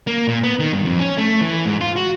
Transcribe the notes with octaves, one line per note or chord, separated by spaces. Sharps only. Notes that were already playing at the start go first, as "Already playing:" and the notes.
A#3
A#2
B3
D#3
G2
F2
C#4
A3
E3
G#2
F4
F#4